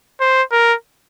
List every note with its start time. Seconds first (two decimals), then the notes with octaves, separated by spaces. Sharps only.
0.21 C5
0.52 A#4